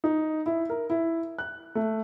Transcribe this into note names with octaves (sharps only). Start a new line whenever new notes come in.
D#4
E4
A#4
E4
F#6
A3